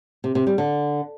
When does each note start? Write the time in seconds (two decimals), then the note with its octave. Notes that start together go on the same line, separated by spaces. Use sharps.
0.24 C3
0.35 C3
0.47 G3
0.58 D3